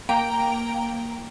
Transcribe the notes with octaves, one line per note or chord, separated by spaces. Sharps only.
A#3 G5 A#5 D7